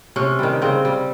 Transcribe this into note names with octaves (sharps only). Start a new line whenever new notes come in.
C3 C#4
D#3 G3
C#3 C4
G3